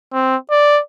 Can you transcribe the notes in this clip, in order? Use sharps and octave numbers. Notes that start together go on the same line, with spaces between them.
C4
D5